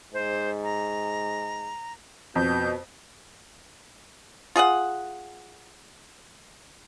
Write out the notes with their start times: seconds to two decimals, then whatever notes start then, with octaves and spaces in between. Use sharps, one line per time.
0.13 G#2 C5
0.63 A#5
2.36 F2 B2 G6
4.56 F4 G#4 F5 F#5